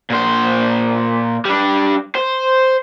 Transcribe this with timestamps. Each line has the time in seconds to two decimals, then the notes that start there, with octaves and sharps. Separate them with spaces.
0.10 A#2 C5
1.45 G3 D4
2.15 C5